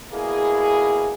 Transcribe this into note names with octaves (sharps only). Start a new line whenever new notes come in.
B2 A#3 E4 G#4